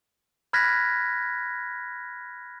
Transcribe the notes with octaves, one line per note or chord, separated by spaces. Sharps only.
B5 F6 F#6 G#6 A#6 B6